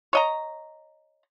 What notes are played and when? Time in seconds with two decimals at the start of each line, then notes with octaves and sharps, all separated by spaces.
0.13 C#5 D#5 A#5